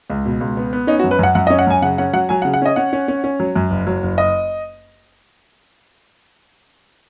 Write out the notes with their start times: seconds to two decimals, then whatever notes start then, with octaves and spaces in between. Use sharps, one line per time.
0.10 C#2
0.25 B2
0.41 C#2
0.57 B3
0.73 B3
0.87 C#4 D#4
0.99 F#4
1.04 F#2
1.11 B4
1.19 F#2 F#5
1.35 F#2 F#5
1.47 D#5
1.50 C#4
1.59 F#5
1.67 F#2 G#5
1.82 C#3 F#5
1.98 C#4 F#5
2.13 F#3 F#5
2.29 F#3 G#5
2.42 F#5
2.45 C#3
2.54 F#5
2.62 C#4 D#5
2.76 C#4 F#5
2.93 C#4
3.08 C#4
3.24 C#4
3.40 F#3
3.56 F#2
3.71 F#1
3.87 F#3
4.03 F#1
4.18 D#5